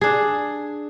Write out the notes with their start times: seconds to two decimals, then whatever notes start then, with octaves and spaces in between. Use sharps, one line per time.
0.01 D4 G#4